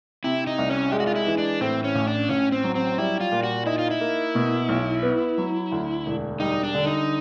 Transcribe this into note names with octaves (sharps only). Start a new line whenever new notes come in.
C3 E4
D#4
C2
C#4
G#3 G4
F#4
F4
E4
E3
D4
A2 C4
C#4
A1
D4
A1 C#4
C4
F#3
C4
G3 E4
F4
A#2
F#4
D#4 E4
F4
E4
A#3
B2
B1
B3
F#3
D2
E1
G3 D#4
D4
D3
D#4